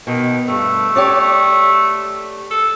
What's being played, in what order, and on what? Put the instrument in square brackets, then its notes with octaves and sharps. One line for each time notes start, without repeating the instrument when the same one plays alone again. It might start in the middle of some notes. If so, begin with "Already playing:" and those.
[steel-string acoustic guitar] B2 [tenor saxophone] D#3
[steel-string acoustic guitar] G2 [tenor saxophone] A3
[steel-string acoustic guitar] G4 C#5 D5
[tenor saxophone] A4